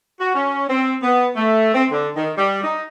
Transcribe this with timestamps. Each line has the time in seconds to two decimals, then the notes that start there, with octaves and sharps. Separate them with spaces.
0.20 F#4
0.35 C#4
0.70 C4
1.03 B3
1.36 A3
1.75 C4
1.92 D3
2.16 D#3
2.38 G3
2.64 D#4